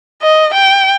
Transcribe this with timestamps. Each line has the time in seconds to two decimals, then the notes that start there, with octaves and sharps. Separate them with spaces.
0.22 D#5
0.54 G5